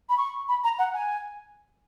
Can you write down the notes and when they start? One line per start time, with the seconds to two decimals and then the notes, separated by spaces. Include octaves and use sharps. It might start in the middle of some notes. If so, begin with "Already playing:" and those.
0.09 B5
0.17 C#6
0.48 B5
0.64 A#5
0.79 F#5
0.94 G#5